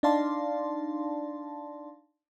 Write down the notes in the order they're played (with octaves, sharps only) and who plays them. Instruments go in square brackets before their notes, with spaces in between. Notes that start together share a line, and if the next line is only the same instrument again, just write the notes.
[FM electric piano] D4 D#4 D5 F5 A5 C6